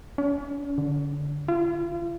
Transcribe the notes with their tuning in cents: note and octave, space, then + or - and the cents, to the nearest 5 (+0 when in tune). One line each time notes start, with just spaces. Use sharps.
C#4 +40
D3 -15
F4 -40